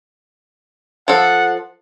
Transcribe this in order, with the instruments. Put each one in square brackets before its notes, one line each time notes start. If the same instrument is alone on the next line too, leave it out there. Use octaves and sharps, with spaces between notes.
[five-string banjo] F3 A4 [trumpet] F#5